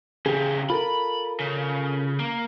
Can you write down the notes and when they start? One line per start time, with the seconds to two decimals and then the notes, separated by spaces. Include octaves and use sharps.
0.26 C#3 G4 G#4
0.70 F4 A4 A#4 B5
1.40 C#3
2.20 A#3